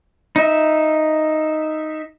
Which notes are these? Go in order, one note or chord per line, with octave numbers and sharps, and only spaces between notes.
D#4 E5